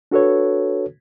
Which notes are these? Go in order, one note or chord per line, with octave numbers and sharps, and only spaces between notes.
D4 F#4 A4 B4 C#5